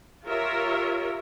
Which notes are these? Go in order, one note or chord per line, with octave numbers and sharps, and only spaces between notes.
F4 G4 A#4 C#5 E5